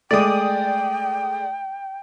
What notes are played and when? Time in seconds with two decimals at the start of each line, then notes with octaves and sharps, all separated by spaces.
0.11 G#3 A3 D5 G5 D#6